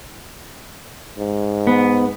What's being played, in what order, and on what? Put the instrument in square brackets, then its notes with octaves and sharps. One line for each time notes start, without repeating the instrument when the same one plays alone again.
[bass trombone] G#2
[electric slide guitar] B3